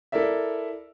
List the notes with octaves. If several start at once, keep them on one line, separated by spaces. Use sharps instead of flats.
E4 A4 A#4 D5 E5